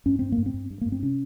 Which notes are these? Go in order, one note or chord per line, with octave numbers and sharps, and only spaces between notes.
G2 C#4
G2 C4
A#3
G2
C4
G2
G2
G2 A#3
C4
C3 C#4